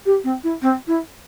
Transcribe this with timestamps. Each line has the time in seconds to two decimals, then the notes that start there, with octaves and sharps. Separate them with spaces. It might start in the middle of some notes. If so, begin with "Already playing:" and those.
0.05 G4
0.24 C4
0.43 E4
0.62 C4
0.87 E4